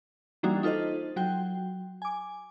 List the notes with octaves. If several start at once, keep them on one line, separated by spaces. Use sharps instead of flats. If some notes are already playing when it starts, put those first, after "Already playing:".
E3 G3 A#3 D4 D#4 F#4
D#4 F4 A4 C5 D#5
F#3 F#4 G5
G#5 D6